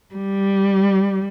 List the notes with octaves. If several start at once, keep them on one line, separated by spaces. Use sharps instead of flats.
G3